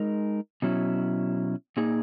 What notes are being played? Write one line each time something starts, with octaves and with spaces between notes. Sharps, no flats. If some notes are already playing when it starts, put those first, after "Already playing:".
Already playing: G#3 D#4 A#4
B2 F#3 C#4 E4
A#2 A#3 D#4 G#4